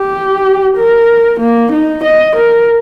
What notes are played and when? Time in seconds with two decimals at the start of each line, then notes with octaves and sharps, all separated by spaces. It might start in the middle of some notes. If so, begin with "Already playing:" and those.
Already playing: G4
0.77 A#4
1.40 A#3
1.72 D#4
2.04 D#5
2.36 A#4